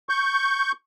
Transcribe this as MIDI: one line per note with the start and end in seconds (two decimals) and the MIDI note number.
0.09 0.72 85
0.09 0.72 91